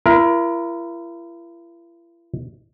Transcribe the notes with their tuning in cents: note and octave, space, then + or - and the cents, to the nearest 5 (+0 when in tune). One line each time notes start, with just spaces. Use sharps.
E4 +45 A#4 +20